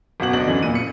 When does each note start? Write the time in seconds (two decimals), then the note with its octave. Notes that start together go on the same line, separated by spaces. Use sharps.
0.20 F#1 B2 F#4 F#7
0.33 D2 D4 D#5 F#7
0.47 F#2 D3 E3
0.62 E1 A#2 D#7
0.75 C#7